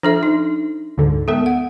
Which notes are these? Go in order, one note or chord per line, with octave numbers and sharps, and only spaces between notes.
F3 D4 A4 E5
D#4
D2 G#2 D3
G#3 B3 A4 A#4 E5
F#5